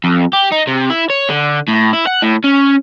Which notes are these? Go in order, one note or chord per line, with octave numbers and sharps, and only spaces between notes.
F2
G4
D#4
C3
E4
C#5
D3
A2
E4
F#5
A2
C#4